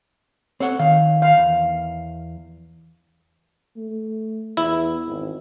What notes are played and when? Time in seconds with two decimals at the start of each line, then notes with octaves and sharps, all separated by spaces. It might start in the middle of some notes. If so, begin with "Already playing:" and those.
0.60 C4 A4 C#5 F#5
0.79 D#3 F5
1.22 F5
1.38 E2
3.76 A3
4.57 E2 E4
5.07 G#1